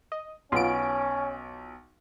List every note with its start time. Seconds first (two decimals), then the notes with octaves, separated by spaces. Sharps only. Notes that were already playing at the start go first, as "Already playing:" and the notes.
0.12 D#5
0.52 B1 B3 C#4 F4 D7